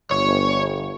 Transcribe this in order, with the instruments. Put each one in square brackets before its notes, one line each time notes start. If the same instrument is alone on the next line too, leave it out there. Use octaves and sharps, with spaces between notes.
[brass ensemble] G1 [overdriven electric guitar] C#5